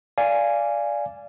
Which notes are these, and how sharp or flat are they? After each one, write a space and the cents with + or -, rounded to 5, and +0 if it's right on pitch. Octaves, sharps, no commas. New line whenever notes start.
D5 -10 F5 -20 G#5 +0